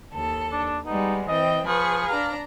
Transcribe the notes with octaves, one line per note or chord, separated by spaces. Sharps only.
D#2 A4
D4
G3 G#3 B3 D#4
E3 C4 D#5 G5
F3 G#4 B4 C#6
D4 F5 A#5